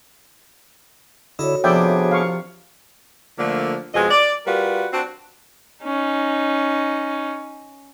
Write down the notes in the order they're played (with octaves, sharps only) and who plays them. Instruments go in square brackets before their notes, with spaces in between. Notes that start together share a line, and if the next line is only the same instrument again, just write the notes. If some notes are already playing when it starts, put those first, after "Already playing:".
[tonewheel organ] D3 E4 [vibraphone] F#4 A4 C#5 [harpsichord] D#5
[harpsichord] C3 F3 [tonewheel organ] B3 D4 G#4 [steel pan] D5 E5 G5
[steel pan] F5 C#6
[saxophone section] D3 F3 A3 A#3 D4
F2 B2 G#3 G#4 D#5
D5
G3 F4 F#4 A#4 B4
C4 D4 F#4
[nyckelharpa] C#4 D#4